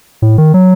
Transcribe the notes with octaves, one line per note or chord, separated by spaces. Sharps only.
A2
D#3
F#3